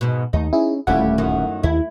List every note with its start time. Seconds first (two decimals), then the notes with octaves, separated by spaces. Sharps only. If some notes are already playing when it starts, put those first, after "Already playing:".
0.01 G#2 B2
0.33 D#2 A3 D#4
0.53 C#4 E4 G#4
0.87 D#1 D2 G3 A3 C#4 E4 F4 F#5
1.18 F#2 D#3
1.63 D#2 E4